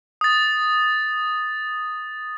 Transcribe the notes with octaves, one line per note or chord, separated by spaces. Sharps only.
D#6 A6